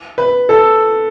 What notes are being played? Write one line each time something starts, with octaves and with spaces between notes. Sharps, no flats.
B4
A4